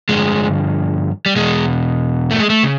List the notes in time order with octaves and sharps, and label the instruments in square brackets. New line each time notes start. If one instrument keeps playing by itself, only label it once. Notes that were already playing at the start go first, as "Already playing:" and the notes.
[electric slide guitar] G2 D3 F3 G#3
G3
E2 B2 G#3
A3
G#3
A3
C#3